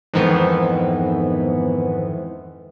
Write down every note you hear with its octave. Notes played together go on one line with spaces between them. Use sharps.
F2 G#2 D#3 E3 B3